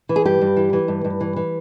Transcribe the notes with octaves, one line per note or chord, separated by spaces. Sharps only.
E3
G#4
G2 G4
G2
E3
E3
G2
G2
E3
E3